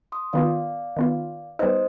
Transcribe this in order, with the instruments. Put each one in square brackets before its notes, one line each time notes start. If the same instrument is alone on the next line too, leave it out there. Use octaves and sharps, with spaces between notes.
[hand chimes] C6 D#6
[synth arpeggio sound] D#3 B3 F4 [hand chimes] D5 F5
[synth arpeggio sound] D#3 B3 F4
[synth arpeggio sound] G3 B3 D#4 [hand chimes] C5 D#5